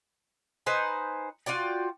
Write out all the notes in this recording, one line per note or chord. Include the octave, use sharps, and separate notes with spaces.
D#4 B4 C5 G#5
F4 F#4 D5 G5